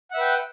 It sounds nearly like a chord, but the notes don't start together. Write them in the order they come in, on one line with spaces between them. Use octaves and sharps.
F#5 E5 B4 G5